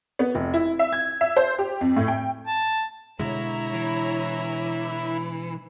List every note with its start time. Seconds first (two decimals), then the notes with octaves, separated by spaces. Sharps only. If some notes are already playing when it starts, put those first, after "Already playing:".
0.19 B3
0.35 F1
0.54 E4
0.79 E5
0.92 G#6
1.21 E5
1.37 C5
1.59 G4
1.81 F2
1.96 A2
2.08 G5
2.48 A5
3.19 B2 D3 G#3 E4 C#5 A#5
3.74 E3